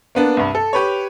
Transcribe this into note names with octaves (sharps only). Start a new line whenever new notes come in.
A#3 B3 D4
C2 G2
A4
G4 B4 C#5